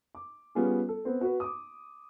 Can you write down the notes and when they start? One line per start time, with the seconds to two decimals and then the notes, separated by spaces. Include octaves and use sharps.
0.15 D6
0.55 G3 B3 C#4 F4 G#4
0.89 A4
1.05 B3 C4
1.21 F#4 B4
1.40 D6 D#6